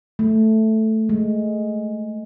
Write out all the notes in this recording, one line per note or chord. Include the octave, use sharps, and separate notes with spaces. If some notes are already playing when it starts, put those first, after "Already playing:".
A3
G#3